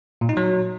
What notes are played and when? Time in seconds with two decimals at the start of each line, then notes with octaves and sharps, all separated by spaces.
0.21 A#2
0.29 D#4
0.37 F#3